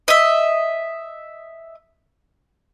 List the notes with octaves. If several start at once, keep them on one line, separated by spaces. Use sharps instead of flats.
D#5 E5